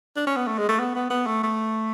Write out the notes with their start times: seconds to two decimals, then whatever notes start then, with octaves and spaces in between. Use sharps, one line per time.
0.16 D4
0.27 C#4
0.36 B3
0.47 A3
0.58 G#3
0.69 A3
0.80 B3
0.95 B3
1.11 B3
1.26 A3
1.43 A3